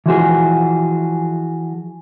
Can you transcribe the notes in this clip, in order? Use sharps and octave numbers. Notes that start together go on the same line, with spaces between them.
E3 F3 F#4 G#4